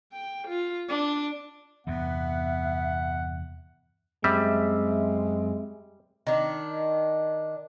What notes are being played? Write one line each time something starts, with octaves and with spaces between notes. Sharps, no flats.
G5
F4
D4
E2 G2 C3 B3 E5 F#5
F#2 G3 G#3 C4 E5
D#3 D4